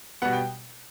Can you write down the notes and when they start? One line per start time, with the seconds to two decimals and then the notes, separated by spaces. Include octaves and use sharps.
0.22 B2 G3 B3 F#5
0.33 G5